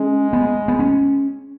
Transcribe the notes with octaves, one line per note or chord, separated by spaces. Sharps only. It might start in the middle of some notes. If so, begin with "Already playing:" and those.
Already playing: G#3 C#4
B3
B3
C#4